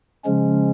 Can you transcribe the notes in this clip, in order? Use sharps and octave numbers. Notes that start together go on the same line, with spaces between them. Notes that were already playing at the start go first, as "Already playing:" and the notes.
C#3 F3 G#3 C#4